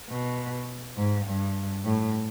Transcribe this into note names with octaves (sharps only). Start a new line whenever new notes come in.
B2
G#2
G2
A2